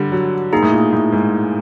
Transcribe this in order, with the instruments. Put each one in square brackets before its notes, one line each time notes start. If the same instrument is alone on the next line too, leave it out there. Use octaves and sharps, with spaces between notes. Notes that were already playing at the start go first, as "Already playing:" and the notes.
Already playing: [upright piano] D3 G3
F#3
[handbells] A#3 D#4 G#4
[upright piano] A2
A#2
A2
G#2